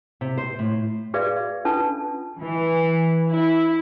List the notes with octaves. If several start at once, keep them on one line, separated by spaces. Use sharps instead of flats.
C3
C5
A2
F#4 G#4 B4 D5 E5 F5
C#4 D4 F4 A4 B4 A5
E3
E4